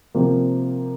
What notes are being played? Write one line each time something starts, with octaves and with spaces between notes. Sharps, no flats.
C3 F3 A#3